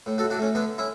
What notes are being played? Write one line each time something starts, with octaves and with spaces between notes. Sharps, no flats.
A2
F#4 A4
A2
D4 F#4
A3 C#4
D3 B3 D4
C#4 E4